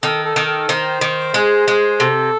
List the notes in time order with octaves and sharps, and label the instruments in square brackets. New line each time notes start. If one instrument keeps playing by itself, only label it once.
[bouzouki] D#3 [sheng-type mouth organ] A4
[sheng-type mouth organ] A4
[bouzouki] D#3
[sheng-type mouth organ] A4
[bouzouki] D#3 [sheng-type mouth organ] C5
[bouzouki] D#3
G#3
G#3
[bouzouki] C3 [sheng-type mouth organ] A4